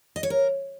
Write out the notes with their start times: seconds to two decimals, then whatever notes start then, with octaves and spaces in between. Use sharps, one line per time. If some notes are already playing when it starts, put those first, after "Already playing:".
0.16 D#5
0.23 C#5
0.30 A#4